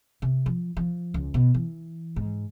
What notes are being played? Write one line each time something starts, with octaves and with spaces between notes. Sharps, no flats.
C3
F3
F3
C#2
B2
E3
G#2